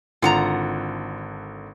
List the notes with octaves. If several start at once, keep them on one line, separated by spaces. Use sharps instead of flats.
G#1 D3 F4 F#5 A#5